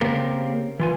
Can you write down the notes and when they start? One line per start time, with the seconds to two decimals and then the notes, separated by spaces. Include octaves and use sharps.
0.01 C#3 A#3 C4 G4 A#4
0.80 E3 F4 G#5